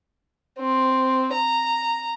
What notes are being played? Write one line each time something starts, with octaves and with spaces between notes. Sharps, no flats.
C4
A#5